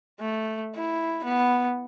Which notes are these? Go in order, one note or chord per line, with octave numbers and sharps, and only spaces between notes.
A3
E4
B3